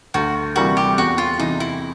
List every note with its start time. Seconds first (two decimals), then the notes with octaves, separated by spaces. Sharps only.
0.14 D2 F#4
0.56 C3 E3 G3 A#3 F#4
0.77 G4
0.98 E2 F#4
1.18 F4
1.39 C3 E3 D#4
1.60 E4